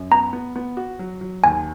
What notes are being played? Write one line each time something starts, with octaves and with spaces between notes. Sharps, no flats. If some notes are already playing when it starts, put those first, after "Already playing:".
Already playing: F#2
B3 A#5
B3
B3
F#4
F#3
F#3
D#2 G#5